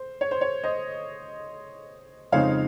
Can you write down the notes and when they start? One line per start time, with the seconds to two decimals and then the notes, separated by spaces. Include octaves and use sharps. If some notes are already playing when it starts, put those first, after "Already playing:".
Already playing: C5
0.21 C#5
0.31 C5
0.41 C#5
0.64 C5 D#5
2.32 F2 C#3 G#3 C4 D#4 C#5 F5